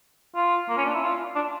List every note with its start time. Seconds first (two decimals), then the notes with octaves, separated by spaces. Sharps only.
0.35 F4
0.69 A#3
0.77 C#4
0.85 D4
0.94 E4
1.03 F4
1.35 D4